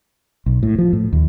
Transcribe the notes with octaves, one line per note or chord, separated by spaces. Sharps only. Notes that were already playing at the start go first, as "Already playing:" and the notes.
B1
A2
F3
A2
D#2